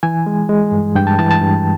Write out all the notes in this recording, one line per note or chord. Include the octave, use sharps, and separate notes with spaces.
E3 G#5
G#3
G#3
G2
G2 G5
A5
E3 A5
A5
G2